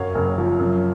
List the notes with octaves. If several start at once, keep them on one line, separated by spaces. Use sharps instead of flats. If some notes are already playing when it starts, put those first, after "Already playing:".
Already playing: F#2 F#3 C#5 F5
F#1
F3
F#2